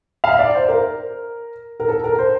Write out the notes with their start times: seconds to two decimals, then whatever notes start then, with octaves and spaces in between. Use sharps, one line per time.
0.24 F5
0.31 E5
0.39 D5
0.55 C5
0.69 A#4
1.80 A#4
1.88 A4
2.04 A#4
2.18 C5